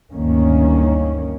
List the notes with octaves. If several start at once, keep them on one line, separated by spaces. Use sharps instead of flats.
G1 D2 D#3 A#3 C#4